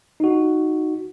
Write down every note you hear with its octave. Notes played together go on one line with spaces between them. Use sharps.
D#4 F#4